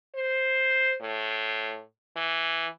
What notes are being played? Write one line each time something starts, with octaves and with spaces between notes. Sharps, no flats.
C5
A2
E3